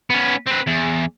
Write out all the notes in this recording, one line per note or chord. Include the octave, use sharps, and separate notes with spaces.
B3 C#4
C4 B4
E2